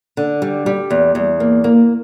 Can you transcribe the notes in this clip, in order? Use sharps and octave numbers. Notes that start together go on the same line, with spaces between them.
D3
G3
G3
E2
E2
A#3
A#3